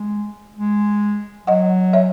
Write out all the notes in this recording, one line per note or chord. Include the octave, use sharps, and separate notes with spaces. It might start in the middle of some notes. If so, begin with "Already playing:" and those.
Already playing: G#3
G#3
F#3 D#5 F#5
C#5 E5